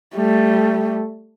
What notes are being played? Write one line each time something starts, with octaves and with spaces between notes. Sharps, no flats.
G3 A3